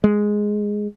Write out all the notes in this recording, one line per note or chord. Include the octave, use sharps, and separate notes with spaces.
G#3